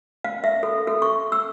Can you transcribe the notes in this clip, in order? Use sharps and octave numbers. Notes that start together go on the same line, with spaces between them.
F5
E5
A4
A4
C#6
E6